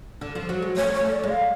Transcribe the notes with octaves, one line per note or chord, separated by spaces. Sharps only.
D3
F3
F#3
G#3
A3 C#5
C#5
A3
D5
G#3
F5